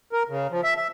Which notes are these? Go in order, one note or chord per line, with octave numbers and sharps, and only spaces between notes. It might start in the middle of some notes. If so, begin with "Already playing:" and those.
A#4
C#3
F3
E5
E5